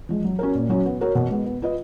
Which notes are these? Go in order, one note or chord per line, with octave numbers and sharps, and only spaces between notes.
F3 G#3
F#3
C#4 F#4 A#4
A#2
F#3 C#4 F#4 C#5
B3
F#4 A#4 C#5
B2
G#3 B3
B3
F4 B4 D#5